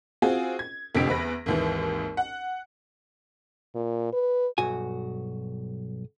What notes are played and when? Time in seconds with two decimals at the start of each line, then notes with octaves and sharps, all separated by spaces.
0.22 C4 F4 F#4 G#4
0.59 G#6
0.95 F1 F2 D3 G4 B6 D7
1.07 E2 B3 B4 A#6
1.46 G#1 D#2 E3
2.17 F#5
3.75 A#2
4.13 B4
4.58 B1 G2 F#4 G#5